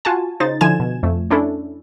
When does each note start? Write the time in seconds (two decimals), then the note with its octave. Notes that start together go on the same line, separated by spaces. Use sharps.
0.05 F4 F#4 G#5 A5
0.40 C#3 D#4 C5 A6
0.61 D3 F3 E4 G#5 G#6 E7
0.80 B2
1.03 F2 A3
1.30 C#4 D4 E4 A4